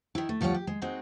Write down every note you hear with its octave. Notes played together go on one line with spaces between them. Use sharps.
D#3 E4
A3
D2 F3 G3 F#4 C#5 F#5
G4
G#3
G#3 C4 D#4 F#4